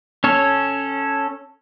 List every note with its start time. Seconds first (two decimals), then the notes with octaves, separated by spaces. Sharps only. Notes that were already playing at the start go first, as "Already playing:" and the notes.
0.24 C#4 A4 C#5